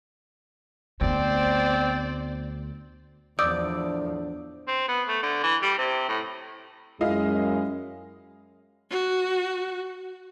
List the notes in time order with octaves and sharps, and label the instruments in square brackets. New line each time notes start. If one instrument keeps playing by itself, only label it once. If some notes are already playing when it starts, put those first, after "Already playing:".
[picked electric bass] D2 [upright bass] A3 B3 [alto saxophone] C4 [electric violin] C5 D5
[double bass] E2 F3 [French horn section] A2 D4 [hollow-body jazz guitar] D5 [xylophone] D#6 E6 G6
[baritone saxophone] C4
B3
A3
D3
E3
G3
C3
A2
[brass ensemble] F#2 G#3 [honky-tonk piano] E4 D#5 F5
[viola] F#4